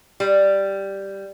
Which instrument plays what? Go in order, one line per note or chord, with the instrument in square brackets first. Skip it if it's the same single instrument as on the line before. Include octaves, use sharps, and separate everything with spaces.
[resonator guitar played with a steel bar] G3